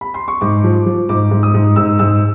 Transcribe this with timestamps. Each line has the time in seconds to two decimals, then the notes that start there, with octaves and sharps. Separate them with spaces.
0.01 B5
0.14 C6
0.28 C#6
0.41 G#2 D6
0.64 F3
0.86 F3
1.09 G#2 D6
1.31 G#2
1.43 D#6
1.54 G#2
1.76 G#2 E6
1.99 G#2 E6